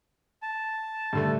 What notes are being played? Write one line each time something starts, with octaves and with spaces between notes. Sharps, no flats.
A5
G2 D3 A3